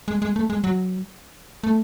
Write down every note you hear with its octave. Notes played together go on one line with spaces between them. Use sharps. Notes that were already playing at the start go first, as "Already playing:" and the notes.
G#3
G#3
A3
G#3
F#3
A3